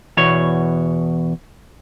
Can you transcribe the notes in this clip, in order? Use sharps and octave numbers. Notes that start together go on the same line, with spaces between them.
E2 B2 C#5